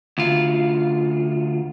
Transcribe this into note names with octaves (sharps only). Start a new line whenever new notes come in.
D2 F4